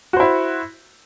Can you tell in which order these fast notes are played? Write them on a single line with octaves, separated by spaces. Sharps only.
F#4 C5 E4